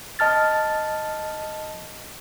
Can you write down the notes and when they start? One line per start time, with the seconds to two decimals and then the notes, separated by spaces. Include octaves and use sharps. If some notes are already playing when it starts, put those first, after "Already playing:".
0.19 D#5 A5 F6 A6